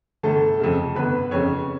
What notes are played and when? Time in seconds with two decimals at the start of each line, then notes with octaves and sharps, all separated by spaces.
0.23 G1 A3 A4
0.60 F2 C#3
0.95 G1 B3 B4
1.31 F2 C#3 C#4 C#5